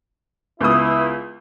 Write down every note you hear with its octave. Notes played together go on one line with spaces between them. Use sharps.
C#2 B3 E4 D#6